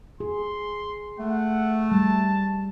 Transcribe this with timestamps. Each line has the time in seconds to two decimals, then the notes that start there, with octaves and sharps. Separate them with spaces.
0.20 G#4 C6
1.19 A3 F#5
1.92 G3 A5